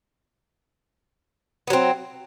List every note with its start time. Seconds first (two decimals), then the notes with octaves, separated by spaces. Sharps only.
1.67 B3
1.70 F#3
1.73 C4